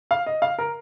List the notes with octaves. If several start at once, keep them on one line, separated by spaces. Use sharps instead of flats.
F5
D#5
F5
A#4